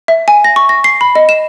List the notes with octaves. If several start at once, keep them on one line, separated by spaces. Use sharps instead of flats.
E5
G#5
A#6
C#6
A#6
C7
B5
D#5
E7